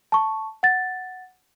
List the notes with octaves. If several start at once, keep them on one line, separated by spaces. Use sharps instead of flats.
A5 C#6
F#5 A6